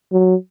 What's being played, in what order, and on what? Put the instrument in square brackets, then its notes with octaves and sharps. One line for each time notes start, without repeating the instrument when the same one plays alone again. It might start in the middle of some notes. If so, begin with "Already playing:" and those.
[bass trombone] F#3